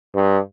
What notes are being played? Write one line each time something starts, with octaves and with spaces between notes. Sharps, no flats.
G2